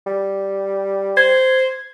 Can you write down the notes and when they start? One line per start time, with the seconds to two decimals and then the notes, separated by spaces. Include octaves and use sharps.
0.07 G3
1.17 C5 G#6